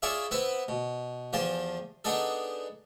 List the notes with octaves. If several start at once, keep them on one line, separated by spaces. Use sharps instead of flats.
E4 F4 G#4 C#5 D5 E5
B3 C4 E4 B4
B2
E2 F3 G4 G#5 A5
B3 D4 D#4 G#4 A4